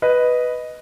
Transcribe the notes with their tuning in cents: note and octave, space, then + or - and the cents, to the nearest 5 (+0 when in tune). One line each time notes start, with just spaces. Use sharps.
B4 +0 D#5 +0